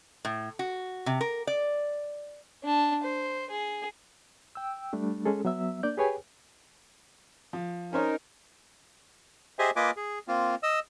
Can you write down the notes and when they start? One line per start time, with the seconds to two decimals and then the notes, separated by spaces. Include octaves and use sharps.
0.25 A2
0.59 F#4
1.06 C3
1.21 A#4
1.47 D5
2.64 D4 A5
3.03 C5
3.50 G#4
4.55 G5 E6
4.93 G3 A3 D4
5.25 G#3 C#4 G#4 A4
5.45 F#3 B3 E5 E6
5.83 A#3 D4 D5 G6
5.97 G4 G#4 B4 C#5 G5 G#5
7.53 F3
7.93 C#4 D#4 A#4 C5 C#5
9.59 G4 G#4 C5 D#5 E5 G#5
9.76 A#3 F4 B4 D#5 G#5 D6
9.96 G#4
10.28 A#3 C4 F4
10.63 D#5 E6